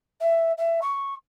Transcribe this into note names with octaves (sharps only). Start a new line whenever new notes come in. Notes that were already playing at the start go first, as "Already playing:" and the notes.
E5
E5
C#6